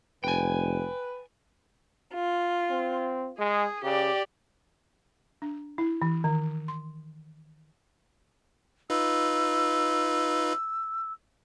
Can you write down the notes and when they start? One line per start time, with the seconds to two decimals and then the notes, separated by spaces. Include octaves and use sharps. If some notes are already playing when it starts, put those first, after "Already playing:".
0.24 F1 B4 G5 G#5
2.14 F4
2.71 C4
3.39 G#3 G#4
3.83 C#3 G4 D5
5.42 D4
5.78 E4
6.02 E3
6.24 D#3
6.68 C6
8.90 D#4 F4 B4 E6